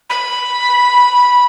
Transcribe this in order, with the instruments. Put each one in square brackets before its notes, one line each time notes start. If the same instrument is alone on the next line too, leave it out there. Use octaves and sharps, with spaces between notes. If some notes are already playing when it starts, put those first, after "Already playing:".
[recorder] B5